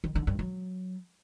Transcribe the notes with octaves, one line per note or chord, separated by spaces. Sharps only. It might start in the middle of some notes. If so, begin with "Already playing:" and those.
D#3
D3
G2
F#3